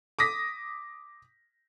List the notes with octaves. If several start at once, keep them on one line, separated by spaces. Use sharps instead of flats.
D6 D#6 A#6 B6